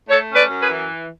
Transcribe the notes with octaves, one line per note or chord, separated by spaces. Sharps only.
A3 A4 C#5
C#4
B4 D5
F#2
G#4 B4
E3